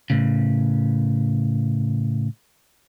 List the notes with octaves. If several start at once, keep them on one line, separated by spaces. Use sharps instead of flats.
A2 C#3